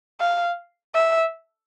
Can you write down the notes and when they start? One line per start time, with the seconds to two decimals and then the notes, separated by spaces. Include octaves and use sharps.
0.20 F5
0.94 E5